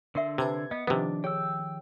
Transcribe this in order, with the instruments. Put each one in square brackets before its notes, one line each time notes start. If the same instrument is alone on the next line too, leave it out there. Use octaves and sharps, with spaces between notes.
[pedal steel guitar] D3 D4 C6 [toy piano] A#4 E5
[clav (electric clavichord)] C3 [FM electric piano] B4 A5 G#6
[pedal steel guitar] B3 [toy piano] D#5
[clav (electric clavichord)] C3 B3 [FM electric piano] D#3 F3 [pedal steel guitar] D4
[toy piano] G4 G#4 C#5 [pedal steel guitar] G5 E6